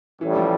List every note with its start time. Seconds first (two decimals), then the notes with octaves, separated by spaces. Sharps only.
0.21 A1 A2 E3 G3
0.36 F3